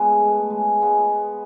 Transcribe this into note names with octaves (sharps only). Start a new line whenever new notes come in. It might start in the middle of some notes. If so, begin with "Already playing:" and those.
Already playing: G#3 B3
A3
G#3
G#3 B3